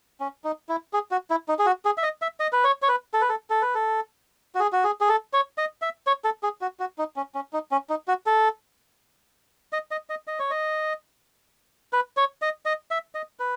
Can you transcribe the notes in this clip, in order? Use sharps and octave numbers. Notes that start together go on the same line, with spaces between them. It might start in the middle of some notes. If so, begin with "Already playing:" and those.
C#4
D#4
E4
G#4
F#4
E4
D#4
G#4
F#4
G#4
E5
D#5
E5
D#5
B4
C#5
C#5
B4
A4
B4
A4
A4
B4
A4
F#4
G#4
F#4
G#4
G#4
A4
C#5
D#5
E5
C#5
A4
G#4
F#4
F#4
D#4
C#4
C#4
D#4
C#4
D#4
F#4
A4
D#5
D#5
D#5
D#5
C#5
D#5
B4
C#5
D#5
D#5
E5
D#5
B4